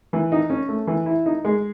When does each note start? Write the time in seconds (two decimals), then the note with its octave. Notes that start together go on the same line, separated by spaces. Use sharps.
0.13 E3
0.32 D#4
0.50 C#4
0.69 A3
0.87 E3
1.06 E4
1.26 D#4
1.45 G#3